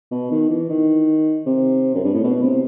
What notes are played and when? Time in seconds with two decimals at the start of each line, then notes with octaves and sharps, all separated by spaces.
0.11 B2
0.31 D#3
0.50 E3
0.69 D#3
1.46 C3
1.95 F#2
2.04 G2
2.14 A2
2.24 B2
2.42 C3